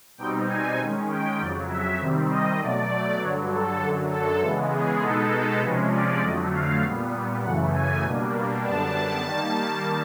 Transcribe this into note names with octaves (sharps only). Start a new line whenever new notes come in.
B2 G3 C4 D#4 G5
G#5
D#3 G#3 C#4
G5
F2 C#3 F#3 D5
E5
C3 D#3 G3 C4
D#5
B2 F#3 A3 D5
G2 D3 F#3 C#5
A4
F#2 D3 F#3 A4
A4
C#3 E3 G#3 B3 A4
G#4
B2 G#3 B3 D#4 A4
C3 F3 G#3 C#4 B4
D5
F2 D3 F#3 A3 D#5
F5
A#2 G3 B3
F#2 C#3 E3 A3 F#5
G#5
B2 G3 A#3 D4
F#2 D3 G3 B3 D4 A5
D#3 G3 A#3 A5